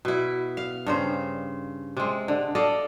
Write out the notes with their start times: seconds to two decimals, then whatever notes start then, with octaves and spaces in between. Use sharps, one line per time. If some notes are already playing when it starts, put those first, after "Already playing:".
0.05 B2 E4
0.57 F5
0.86 G2 C#3 C5
1.97 C3 G#3
2.28 D3
2.55 A4 D5 D#5 F5